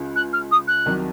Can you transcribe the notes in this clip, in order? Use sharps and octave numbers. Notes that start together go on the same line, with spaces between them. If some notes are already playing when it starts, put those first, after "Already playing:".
Already playing: C#2 C#3 F4
F#6
F6
D#6
F#6
C2 C3 D#3 F#3